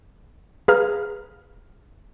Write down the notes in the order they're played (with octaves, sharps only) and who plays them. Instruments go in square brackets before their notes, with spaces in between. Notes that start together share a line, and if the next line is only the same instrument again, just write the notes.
[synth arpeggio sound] G#4 B4 F5 A#5 F6